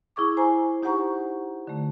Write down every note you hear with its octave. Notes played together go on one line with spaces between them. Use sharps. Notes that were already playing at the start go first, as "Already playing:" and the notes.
E4 G#4 C#6 D6
C5 G#5 A#5
D#4 G4 C5 F#5 A#5 C#6
D3 A3